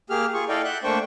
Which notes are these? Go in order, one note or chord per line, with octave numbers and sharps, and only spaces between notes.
A#3 G4 G#4 F6
F4 G#4 C#6
E4 A4 D5 D#5 F5 G5
E5 F#5 F#6 G6
A3 A#3 D4 C5 G5 C#6